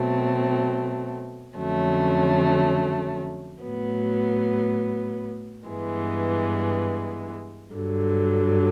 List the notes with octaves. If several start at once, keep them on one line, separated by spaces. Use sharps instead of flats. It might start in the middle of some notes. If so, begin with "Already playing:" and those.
Already playing: B2 F#3 A3 C4
F2 D3 F#3 A3 C#4
A2 F#3 B3
G2 E3 G#3 B3
G2 D3 F#3